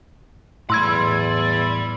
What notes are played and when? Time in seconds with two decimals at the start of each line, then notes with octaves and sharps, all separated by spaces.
0.70 E2 A2 D5 B5 C6 E6 G#6